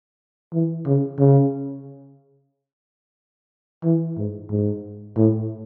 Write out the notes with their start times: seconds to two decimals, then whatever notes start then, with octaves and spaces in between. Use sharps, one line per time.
0.53 E3
0.86 C#3
1.19 C#3
3.84 E3
4.17 G#2
4.50 G#2
5.16 A2